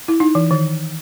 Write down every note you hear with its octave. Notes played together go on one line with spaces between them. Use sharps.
E4
D#4
E3
D#3